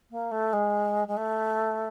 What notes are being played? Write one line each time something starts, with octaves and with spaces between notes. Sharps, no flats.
A#3
A3
G#3
G#3
A3